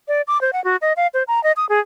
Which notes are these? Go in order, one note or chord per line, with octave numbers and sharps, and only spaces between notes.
D5
D6
C5
F#5
F#4
D#5
F5
C5
A#5
D#5
D#6
G#4